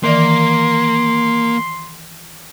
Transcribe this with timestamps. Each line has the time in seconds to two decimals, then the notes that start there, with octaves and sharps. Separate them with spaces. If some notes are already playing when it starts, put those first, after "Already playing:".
0.04 D#3 E3 A#3 D5 C6